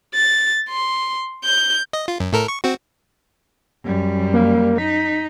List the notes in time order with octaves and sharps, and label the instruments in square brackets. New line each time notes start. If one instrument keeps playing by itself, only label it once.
[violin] A6
C6
G6
[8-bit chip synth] D#5
F4
F#2
A2 A4 A#4
C#6
C4 F#4
[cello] F#2 G3
[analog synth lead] A#3
[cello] D#4 [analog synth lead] B6